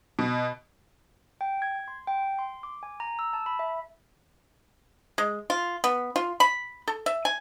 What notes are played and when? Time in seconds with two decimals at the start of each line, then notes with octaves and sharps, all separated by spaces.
0.19 B2
1.41 G5
1.62 G#6
1.88 C6
2.07 G5
2.39 C6
2.63 D6
2.83 G#5
3.00 A#5
3.19 E6
3.33 A5
3.46 B5
3.59 E5
5.18 G#3
5.50 F4
5.84 B3
6.16 F4
6.40 B5
6.88 A4
7.06 E5
7.25 G#5